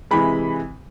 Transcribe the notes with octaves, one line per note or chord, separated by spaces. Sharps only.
C3 E3 G#3 B5